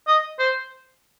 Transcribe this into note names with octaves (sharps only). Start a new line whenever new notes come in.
D#5
C5